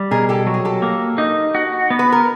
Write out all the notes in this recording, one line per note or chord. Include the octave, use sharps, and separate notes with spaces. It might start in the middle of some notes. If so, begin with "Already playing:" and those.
Already playing: G3
B2 G#4 A#4
G4 A4
F#3
G#4
G4 A4
A#3
D#4
F#4
B3
B4
A#4